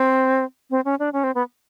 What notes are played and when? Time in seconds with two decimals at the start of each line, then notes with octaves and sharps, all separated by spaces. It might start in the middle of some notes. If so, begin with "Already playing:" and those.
Already playing: C4
0.70 C4
0.85 C#4
0.99 D4
1.13 C#4
1.24 C4
1.35 B3